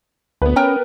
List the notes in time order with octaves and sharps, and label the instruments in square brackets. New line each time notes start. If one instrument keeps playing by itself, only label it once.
[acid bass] D2 [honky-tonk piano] B3 B4
[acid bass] C#4 [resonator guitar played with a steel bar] A#4 G5 A#5